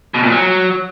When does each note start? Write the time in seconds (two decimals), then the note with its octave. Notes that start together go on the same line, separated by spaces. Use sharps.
0.14 B2
0.23 A#2
0.32 F#3